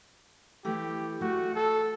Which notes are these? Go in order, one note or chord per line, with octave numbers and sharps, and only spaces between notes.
E3 A3 G4
A3 F#4
A4